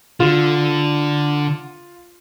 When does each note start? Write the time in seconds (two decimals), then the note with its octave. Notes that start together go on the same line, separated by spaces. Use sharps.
0.20 D3 F4